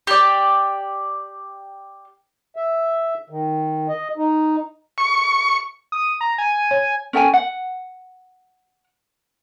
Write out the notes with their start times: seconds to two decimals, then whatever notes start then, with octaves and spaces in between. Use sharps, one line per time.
0.07 G4 D5
2.56 E5
3.30 D#3
3.89 D#5
4.17 D#4
4.98 C#6
5.92 D#6
6.21 A#5
6.38 G#5
6.71 C#5
7.13 C#4 A4 G5 G#5
7.34 F#5